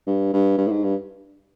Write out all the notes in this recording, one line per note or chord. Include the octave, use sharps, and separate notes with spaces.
G2
G2
G2
A2
G#2
G2